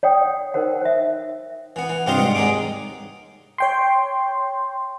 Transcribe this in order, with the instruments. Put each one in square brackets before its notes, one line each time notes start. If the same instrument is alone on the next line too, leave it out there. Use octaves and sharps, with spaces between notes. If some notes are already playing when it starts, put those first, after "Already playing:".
[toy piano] C#5 D5 F#5 G5 D#6
D#4 A#4 C5 F#5
C5 E5
[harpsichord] E3 B3
E3
G2 C3 F4 G4 C5 D#5
G#2 G3 F#5
D#2 G#3 D#4 G#4 D6
[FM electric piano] C#5 G5 C6